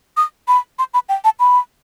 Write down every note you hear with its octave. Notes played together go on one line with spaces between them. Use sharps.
D#6
B5
C6
B5
G5
A5
B5